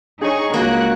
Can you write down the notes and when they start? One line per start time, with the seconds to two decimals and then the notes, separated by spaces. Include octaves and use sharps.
0.21 D4 D#4 G#4 C#5 G#5 C#6
0.54 C#2 A#3 F#4 F#6